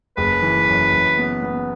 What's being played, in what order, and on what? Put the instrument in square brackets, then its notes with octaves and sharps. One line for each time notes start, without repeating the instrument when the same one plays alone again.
[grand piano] F#1 [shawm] B4
[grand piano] E3
F#2
F#2
B3
B3